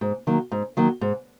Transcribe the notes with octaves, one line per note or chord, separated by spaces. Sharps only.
G#2
D#3 F#3 A#3
G#2
D#3 F#3 A#3
G#2